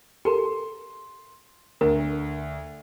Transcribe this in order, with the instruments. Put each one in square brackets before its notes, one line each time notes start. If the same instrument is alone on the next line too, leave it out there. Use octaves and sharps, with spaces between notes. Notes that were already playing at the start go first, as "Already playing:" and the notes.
[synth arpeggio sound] G4 A4 A#4 [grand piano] C6
[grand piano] D2 [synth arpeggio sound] A#4